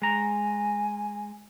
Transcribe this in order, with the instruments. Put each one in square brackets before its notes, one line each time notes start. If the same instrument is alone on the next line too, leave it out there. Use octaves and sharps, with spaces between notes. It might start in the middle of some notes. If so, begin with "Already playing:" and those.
[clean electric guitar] G#3 A#5 [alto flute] G#5